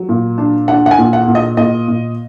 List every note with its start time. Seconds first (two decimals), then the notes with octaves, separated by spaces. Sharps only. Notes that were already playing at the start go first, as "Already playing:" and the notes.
Already playing: F#3
0.09 A#2
0.38 D4
0.68 D4 F#5
0.86 F#5
0.91 G#5
0.98 A#2
1.13 F#5
1.28 A#2
1.35 D#5
1.57 A#2 D#5
1.88 A#2